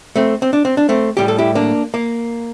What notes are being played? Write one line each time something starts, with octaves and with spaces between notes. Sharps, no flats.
A3 C4
C4
D4
C4
D4
A3 C4
A2 G3 G4
A4
E4 G4
A#3 D4
A#3